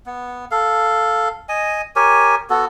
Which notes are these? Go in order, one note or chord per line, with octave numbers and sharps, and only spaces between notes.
B3
A4 F5
D#5 G#5
G4 A#4 C#5 G#5
B3 F#4 A4